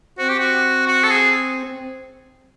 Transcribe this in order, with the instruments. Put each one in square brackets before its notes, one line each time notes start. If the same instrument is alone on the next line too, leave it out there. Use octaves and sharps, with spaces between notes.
[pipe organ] C4 [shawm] F#4
[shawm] G4
F#4
F#4
A4
G#4